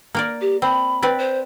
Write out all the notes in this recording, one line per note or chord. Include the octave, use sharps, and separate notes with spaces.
A#3 A#4 D5
G4
C4 B5
C4 B4 D5
C5